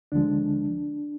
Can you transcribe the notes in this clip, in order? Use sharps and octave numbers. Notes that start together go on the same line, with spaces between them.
D2 D3 F3 G#3 D4